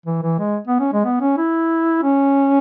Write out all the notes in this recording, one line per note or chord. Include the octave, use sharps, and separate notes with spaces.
E3
E3
G#3
B3
C#4
G#3
B3
C#4
E4
C#4